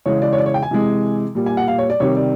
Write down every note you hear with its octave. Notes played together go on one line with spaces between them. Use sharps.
C#3 E3 G#3 C#5
D5
C#5
D5
C#5
G5
G#5
C3 E3 G#3
A#2 G3
G#5
F#5
F5
C#5
D5
C3 D#3 G3 C#5
D5